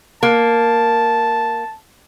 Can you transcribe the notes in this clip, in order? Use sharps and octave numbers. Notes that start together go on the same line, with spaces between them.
A#3 A5